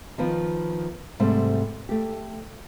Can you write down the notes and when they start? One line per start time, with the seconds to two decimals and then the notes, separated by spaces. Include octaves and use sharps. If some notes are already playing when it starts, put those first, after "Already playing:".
0.18 D#3 F3 B3
1.20 G#2 C3 G3 A3
1.89 A3 G4